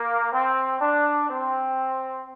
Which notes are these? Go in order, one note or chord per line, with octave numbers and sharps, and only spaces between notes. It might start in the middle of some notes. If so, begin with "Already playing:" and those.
Already playing: A#3
C4
D4
C4